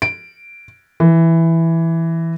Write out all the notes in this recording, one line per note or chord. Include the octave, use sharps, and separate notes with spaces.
D7
E3